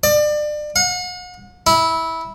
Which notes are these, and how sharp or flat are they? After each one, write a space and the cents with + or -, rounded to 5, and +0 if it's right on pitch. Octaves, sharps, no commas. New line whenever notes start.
D5 +30
F#5 -40
E4 -15